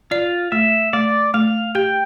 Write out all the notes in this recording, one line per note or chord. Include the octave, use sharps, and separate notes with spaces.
F4 D5
A3 E5
A3 D5
A3 F5
G4 G5